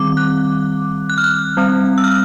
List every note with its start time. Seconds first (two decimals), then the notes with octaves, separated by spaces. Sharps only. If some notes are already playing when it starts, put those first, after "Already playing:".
Already playing: D#3 G3 C4 D6
0.17 F#6
1.10 F#6
1.18 F6
1.24 F#6
1.57 G3 C4
1.98 E6
2.04 F6